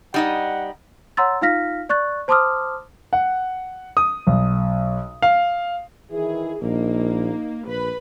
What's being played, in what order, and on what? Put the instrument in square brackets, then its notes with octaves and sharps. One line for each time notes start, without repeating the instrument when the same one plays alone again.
[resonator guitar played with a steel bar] G3 D#4 D#5 [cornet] F#5
[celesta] C#5 F#5 A#5 C6 E6 A6
D#4 F4 F5 F6 A#6 B6
D5 C#6 F#6 A6
C5 A5 C6 D6 D#6 F6
[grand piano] F#5
D#6
B1
F5
[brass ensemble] D#3 E3 E4 [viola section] G#4
[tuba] A#1 [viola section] A#3 [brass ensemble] D#4
[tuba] A#1 [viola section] B4 B5